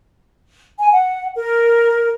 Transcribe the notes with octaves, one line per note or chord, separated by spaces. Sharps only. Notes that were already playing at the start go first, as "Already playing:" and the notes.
G#5
F#5
A#4